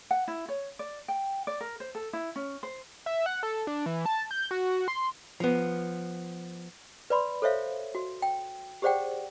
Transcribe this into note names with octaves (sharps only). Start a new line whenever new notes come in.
F#5
E4
C#5
D5
G5
D5
A#4
C5
A4
E4
C#4
C5
E5
F#5
A4
D4
E3
A5
G6
F#4
C6
F3 B3
B4 D5 B5 C6
A4 C5 C#5 E5 F5
F#4
G5
G4 G#4 C5 D5 F#5 G5